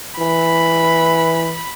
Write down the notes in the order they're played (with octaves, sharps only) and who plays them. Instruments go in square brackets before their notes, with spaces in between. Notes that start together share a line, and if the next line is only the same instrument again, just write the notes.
[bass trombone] E3 [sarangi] B5